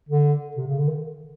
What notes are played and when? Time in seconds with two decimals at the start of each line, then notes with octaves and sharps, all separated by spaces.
0.09 D3
0.57 C3
0.67 C#3
0.78 D3
0.88 D#3